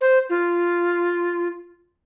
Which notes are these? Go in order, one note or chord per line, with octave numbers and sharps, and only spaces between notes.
C5
F4